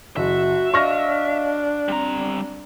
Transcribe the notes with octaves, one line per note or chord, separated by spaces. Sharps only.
F#1 F#4 E5
D4 D#5 F5 C#6 F6 A#6
G3 C4 A#5